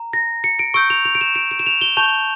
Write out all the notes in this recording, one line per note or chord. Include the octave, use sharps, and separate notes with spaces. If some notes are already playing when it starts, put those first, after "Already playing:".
Already playing: A#5
A#6
C#7
D7
C#6 E6 G6 D7
F7
F7
D7
E7
D7
D7
E7
F7
G7
A5 C#6 G6 F7